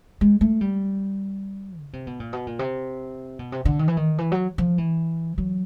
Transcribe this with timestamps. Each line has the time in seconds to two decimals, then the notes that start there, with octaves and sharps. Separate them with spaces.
0.21 G#3
0.41 A3
0.61 G3
1.80 C#3
1.93 C3
2.07 B2
2.20 A#2
2.33 B2
2.47 A#2
2.59 C3
3.39 B2
3.52 C3
3.65 D3
3.79 D#3
3.88 E3
3.97 D#3
4.18 E3
4.32 F#3
4.58 F3
4.78 E3
5.38 F#3